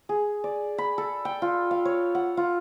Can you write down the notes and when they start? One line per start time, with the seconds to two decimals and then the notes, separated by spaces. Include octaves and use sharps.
0.09 G#4
0.44 D5
0.78 B5
0.98 A4
1.25 G5
1.42 F4
1.71 F5
1.85 C#5
2.15 F#5
2.37 F4